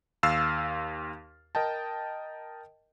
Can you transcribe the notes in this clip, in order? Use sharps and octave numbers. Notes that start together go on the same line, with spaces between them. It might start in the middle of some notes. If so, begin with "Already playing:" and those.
D#2 F5 E6 F6 A6 C7
A#4 D#5 G5 A5